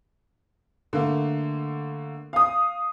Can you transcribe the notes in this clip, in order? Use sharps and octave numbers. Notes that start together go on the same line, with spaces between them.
D3 A3 A#3
F5 D#6